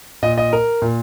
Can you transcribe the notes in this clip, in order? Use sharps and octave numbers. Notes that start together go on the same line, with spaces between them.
A#2 D#5
D#5
A#4
A#2